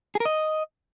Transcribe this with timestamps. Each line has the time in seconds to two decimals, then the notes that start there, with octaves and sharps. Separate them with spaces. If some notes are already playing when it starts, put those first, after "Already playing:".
0.15 G#4
0.20 A#4
0.25 D#5